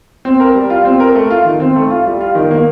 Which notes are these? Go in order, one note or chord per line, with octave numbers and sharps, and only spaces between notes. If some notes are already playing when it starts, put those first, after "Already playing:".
C4
A#4
G3
F4
C4
A#4
A3
F4
D#3
C4
A3
F4
G3
F4
D#3
A#3